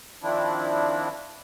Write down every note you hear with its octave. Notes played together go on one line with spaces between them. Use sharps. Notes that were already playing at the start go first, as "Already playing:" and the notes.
D#3 F3 C4 D4 E4